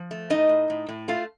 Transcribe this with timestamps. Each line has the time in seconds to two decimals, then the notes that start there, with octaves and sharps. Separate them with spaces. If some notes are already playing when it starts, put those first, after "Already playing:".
Already playing: F3
0.11 A3
0.30 A2 D#4 D#5
0.49 A2
0.70 A2
0.88 A2
1.08 A3 F4 F5